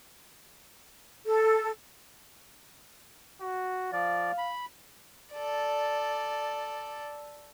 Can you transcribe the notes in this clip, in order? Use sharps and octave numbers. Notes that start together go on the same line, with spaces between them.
A4
F#4
F3 D5 F5
B5
A4 D5